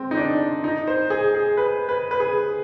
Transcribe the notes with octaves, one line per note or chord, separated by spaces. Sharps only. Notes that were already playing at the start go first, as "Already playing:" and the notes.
Already playing: G#3 C4
D#4
D4
D#4
C5
G#4
G#4
B4
B4
B4
G#4